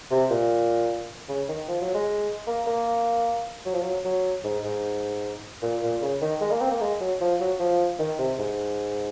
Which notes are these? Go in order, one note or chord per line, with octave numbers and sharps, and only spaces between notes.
C3
A#2
C#3
D#3
F3
F#3
G#3
A#3
A#3
F#3
F3
F#3
F#3
G#2
G#2
A#2
A#2
C#3
D#3
G#3
A#3
C4
A#3
G#3
F#3
F3
F#3
F3
D#3
C3
G#2